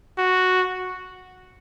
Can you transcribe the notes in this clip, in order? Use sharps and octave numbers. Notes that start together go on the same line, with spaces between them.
F#4